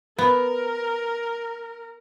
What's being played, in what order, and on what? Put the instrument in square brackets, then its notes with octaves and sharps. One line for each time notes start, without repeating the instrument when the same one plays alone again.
[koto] B3 [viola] A#4